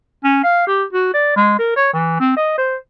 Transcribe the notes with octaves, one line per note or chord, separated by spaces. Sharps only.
C#4
F5
G4
F#4
D5
G#3
A#4
C#5
E3
C4
D#5
C5